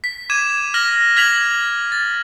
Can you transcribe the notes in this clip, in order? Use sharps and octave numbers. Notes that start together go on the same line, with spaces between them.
B6
D6 G#6 D#7 E7
F6 A#6 F#7
F6 G#6 B6 F7 F#7
A6